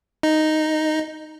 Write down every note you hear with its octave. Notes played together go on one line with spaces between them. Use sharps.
D#4